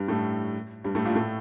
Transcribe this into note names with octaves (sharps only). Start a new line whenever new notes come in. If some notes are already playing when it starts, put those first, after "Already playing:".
Already playing: G2 G3
A2 A3
G2 G3
A2 A3
A#2 A#3
A2 A3